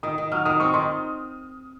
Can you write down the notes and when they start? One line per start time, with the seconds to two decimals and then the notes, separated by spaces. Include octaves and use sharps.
0.03 D#3 D#6
0.18 D#3
0.32 F#3 F6
0.45 D#3 D#6
0.60 C4 C#6
0.74 D#3 C6